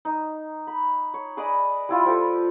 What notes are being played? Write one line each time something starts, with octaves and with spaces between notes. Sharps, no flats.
D#4
B5
C#5
G#4 B4 D5 D#5
G3 E4 F4
F3 G4 A4